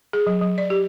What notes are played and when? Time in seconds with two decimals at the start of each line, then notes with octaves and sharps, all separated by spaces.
0.13 G#4
0.27 F#3
0.41 F#3
0.58 D5
0.70 G4